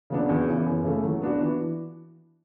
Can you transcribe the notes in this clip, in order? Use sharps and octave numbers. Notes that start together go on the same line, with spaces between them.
C#3 F#3 B3 D4
E2
C#3 E3 B3
F#2
C#3 E3 A3
F#3
B3 D4 F#4
E3